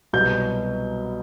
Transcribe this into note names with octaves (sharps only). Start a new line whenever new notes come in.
C2 B2 F#3 G6